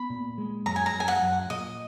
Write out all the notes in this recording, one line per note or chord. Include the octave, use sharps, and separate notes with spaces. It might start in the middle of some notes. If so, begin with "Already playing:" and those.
Already playing: B3 B5
A#2
G#3
F#2 A#5
G#5
A#5
F#2
G#5
F#5
F#2
A#2 D#5